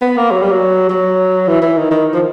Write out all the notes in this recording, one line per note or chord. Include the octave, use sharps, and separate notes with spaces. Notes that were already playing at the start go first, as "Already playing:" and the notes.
B3
A#3
F#3
G3
F#3
F#3
E3
E3
D#3
D#3
F3